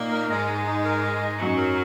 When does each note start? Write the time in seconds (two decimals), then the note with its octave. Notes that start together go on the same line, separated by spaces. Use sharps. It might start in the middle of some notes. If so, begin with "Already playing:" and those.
Already playing: A#2 A#3 D#4
0.12 A#4
0.30 G#2 G#3 D#5
0.48 D#4
0.67 D#4
0.85 A#4
1.03 D#5
1.22 D#4
1.39 F#2 F#3 D#4
1.57 A#4